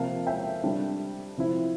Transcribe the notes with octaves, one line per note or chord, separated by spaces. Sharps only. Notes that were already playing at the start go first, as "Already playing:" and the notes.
Already playing: C3 F3 A#3 F5 A5
E5 G5
C3 G3 D4
C3 F3 C4 E4